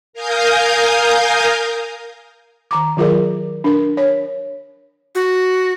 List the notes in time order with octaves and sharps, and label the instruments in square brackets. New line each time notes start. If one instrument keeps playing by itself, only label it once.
[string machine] A#4 F5 G#5 A#5 D#6 G6
[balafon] D#3 A#5 D6
D#3 F#3 F4 G#4 A#4 D5
D4 A#4
C#5
[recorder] F#4